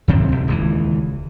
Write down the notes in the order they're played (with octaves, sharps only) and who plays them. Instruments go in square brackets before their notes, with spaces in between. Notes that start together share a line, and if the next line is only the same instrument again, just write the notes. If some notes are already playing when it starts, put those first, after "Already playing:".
[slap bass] D#2 C3 C4
B1
D#1 C#2 E3